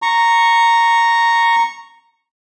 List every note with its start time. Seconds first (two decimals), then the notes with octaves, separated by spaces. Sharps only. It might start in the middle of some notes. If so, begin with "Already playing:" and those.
0.02 A#5 C#6